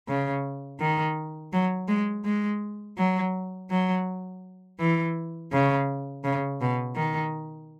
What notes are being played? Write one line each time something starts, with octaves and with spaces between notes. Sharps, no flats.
C#3
D#3
F#3
G#3
G#3
F#3
F#3
E3
C#3
C#3
B2
D#3